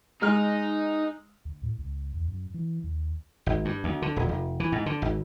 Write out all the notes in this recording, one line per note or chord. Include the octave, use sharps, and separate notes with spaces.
G#3 D#4 F6
D2
A2
C#2
E2
F#2
E3
D#2
G#1
G2
D2
D3
D#1
F1
E3
G#2
D3
G#1